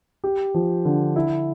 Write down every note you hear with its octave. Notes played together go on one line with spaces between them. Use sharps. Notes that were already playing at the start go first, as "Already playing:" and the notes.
G4
F3
D3
E4